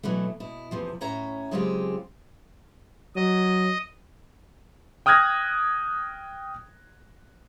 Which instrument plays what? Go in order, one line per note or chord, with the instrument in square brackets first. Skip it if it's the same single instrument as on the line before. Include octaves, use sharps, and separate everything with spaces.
[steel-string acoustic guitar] B2 E3 F#3 A3
B2 E4
E2 C3 F3
A2 C#4 C#5 E5 A#5
C#3 F#3 G#3 C4 F4 G4
[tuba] F#3 [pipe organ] D#5
[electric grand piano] G5 D#6 F6 F#6 G#6 A#6